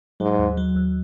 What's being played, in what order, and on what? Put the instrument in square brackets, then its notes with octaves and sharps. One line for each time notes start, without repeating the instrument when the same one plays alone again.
[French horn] G#2 [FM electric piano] F#3
[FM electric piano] D#2
F#3
D#2